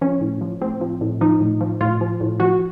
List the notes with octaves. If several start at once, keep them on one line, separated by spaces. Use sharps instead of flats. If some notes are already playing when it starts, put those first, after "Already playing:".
F3 C#4
A2
F3
A2 C4
F3
A2
F3 D#4
A2
F3
A2 F4
F3
A2
F3 F#4